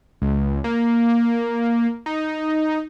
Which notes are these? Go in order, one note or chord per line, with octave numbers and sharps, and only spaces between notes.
C#2
A#3
D#4